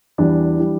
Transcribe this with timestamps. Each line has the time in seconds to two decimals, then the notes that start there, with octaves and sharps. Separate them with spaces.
0.18 E2 E3 G3 D4
0.59 E3 G3